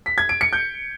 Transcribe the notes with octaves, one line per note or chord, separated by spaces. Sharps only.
B6
G#6
D7
C#7
G6